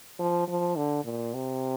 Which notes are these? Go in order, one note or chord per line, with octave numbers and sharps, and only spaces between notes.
F3
F3
D3
A#2
C3